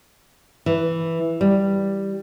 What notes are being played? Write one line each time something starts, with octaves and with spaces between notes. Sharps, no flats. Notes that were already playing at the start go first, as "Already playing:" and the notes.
E3
G3